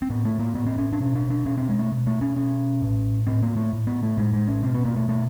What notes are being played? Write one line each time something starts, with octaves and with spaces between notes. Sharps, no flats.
C4
A2 B3
A3
A#3
A2 B3
C4
C#4
D4
B2 C#4
D4
D4
B2 C#4
C4
G#3
A3
B2
A3
C#4
B2 C#4
A2
A2 C4
A#3
A3
A2
B3
A3
A2 G#3
G#3
C#4
B2 C4
B3
A#3
A3
B2 A3